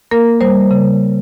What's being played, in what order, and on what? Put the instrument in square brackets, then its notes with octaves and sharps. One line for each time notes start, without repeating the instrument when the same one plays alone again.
[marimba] A#3 A#4
G3 C5
C#3